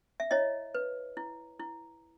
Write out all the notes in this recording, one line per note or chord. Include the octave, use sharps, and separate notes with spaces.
E5
E4 C#5 D#5
B4
E4
E4